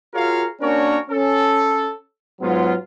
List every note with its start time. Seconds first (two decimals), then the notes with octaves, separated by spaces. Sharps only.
0.15 F4 F#4 G#4 A#4 C#5 F5
0.61 A#3 C#4 D4 F#4 A#4 C#5
1.11 C#4 A4
2.41 G#2 F#3 B3 F4